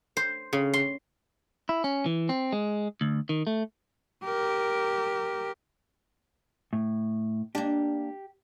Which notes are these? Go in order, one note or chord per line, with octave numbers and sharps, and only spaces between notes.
C5
C#3
C6
E4
C#4
E3
C4
G#3
D2
D#3
A3
G4 A#4
A2
A#3 D4 G4